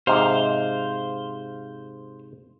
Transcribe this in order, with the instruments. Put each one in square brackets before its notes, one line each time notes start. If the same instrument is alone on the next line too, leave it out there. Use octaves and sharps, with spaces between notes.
[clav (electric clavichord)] G#2 C3 [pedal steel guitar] C5 F5